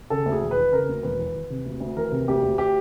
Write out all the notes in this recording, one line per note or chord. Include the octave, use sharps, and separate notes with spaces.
C#3 A4
D2
G#4
E1
B4
E3
C#3 A#4
D2
E1 B4
E3
E3
C3
D2
D2
E3 A#4
C3
D2 G4
D2
G4